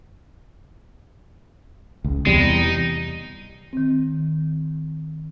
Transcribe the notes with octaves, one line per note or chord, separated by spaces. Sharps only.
C#2
E2 C3 G3 G#3
D#4
D#3 C4